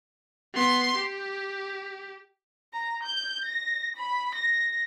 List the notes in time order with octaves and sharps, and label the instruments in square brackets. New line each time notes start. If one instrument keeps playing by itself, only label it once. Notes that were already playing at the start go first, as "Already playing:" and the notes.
[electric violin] B3 C6
G4
[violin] A#5
G6
A#6
B5
A#6